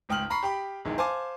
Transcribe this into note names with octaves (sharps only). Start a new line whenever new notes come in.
G#1 C#2 G5 D#6 F6 F#7
A#5 B5 C#6 C7
G4 G5 B5
A#1 E2 D#3 G#3
C5 F5 G#5 A5 D6